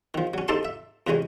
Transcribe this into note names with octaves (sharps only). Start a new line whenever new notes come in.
D#3 F3
F#3 C#4
C4 D#4 G4 A4 A5 C6
E5
F2 C3 E3 G#3 C#4